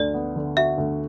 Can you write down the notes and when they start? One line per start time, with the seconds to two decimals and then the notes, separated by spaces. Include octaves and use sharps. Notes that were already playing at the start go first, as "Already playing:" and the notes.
Already playing: D2 D3 F#4 D5
0.14 B3
0.36 D3
0.57 F#4 E5
0.78 D2